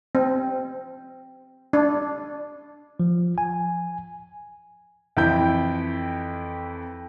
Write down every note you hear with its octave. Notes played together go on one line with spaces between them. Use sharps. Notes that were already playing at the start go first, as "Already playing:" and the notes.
C4
D4
F3
G#5
F2 E3 E4 G5 G6